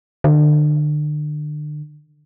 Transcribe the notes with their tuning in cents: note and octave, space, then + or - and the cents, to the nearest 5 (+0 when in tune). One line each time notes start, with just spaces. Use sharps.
D3 +35